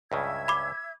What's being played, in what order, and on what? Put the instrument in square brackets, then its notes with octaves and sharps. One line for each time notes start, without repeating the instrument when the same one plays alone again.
[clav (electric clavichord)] C#2 G2 C#3 [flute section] E5 E6 G#6
[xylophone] B5 D6